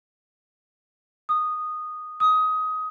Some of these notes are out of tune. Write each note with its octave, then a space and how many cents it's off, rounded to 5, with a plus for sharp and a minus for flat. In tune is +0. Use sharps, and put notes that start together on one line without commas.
D#6 -10
D#6 +20